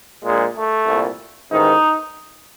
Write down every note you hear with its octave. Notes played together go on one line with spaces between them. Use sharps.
A#1 A#2 G#3
A3
C2 A#2
A1 G#2 D#3 D#4